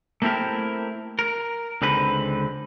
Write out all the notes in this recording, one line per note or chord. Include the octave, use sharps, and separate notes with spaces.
A3 A#3 C4 E4 G4 A#4
A#4
C#2 D3 C4 D#4 B4